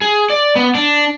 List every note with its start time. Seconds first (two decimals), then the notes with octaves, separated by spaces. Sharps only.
0.01 G#4
0.30 D5
0.56 B3
0.75 D4